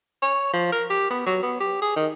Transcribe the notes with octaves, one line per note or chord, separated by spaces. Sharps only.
C#5
F3
A#4
G4
B3
F#3
B3
G4
G#4
D#3